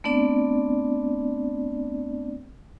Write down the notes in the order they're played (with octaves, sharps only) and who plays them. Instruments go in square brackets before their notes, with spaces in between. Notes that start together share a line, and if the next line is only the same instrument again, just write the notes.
[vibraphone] A3 B3 C4 D4 D5